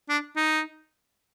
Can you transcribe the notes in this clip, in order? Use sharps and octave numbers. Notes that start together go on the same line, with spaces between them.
D4
D#4